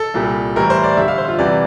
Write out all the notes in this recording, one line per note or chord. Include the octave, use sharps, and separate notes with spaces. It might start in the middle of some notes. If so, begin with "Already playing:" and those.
Already playing: A4
C2 A#2 G3
A2 E3 G3 A#4
C5
D5
G2 D3 G3 E5
F5
C5
F4
E2 C3 E3 G3 D5